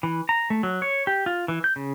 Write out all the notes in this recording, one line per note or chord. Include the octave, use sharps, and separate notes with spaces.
E3
A#5
A3
F#3
C#5
G4
F4
E3
G6
C#3